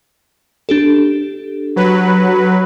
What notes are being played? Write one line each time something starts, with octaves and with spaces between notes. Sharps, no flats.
D4 G4 A4
F#3 B4